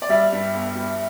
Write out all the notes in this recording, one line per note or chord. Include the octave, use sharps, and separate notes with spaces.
D5
G3 E5
G2
G1
G3